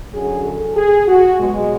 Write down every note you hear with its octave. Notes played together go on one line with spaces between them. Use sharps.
F#2 D3 F#3 G#4
A4
G#4
F#4
B2 F#3 G#3